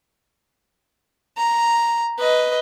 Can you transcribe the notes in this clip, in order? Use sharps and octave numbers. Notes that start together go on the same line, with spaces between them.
A#5
B4 D#5